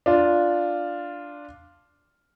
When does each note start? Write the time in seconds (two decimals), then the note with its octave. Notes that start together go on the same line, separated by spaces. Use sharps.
0.06 D4 F4